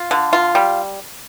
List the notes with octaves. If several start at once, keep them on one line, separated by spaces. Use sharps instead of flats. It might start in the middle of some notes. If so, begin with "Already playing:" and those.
Already playing: F4
D3
F4
G3